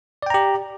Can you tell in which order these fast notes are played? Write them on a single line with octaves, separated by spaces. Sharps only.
D5 G5 A#5 G4